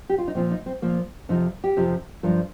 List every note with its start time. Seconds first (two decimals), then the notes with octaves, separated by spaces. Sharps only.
0.10 G4
0.18 F4
0.28 D#4
0.35 A#2 F3 C4
0.51 D#4
0.66 C4
0.82 A#2 F3 A#3
1.29 F2 C3 F3 D#4
1.64 G4
1.77 F2 C3 F3
2.23 G2 F3 A#4